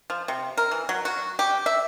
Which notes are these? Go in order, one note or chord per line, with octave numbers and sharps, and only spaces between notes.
F3
C3
A#4
E3
F#3
F#4
G4
E5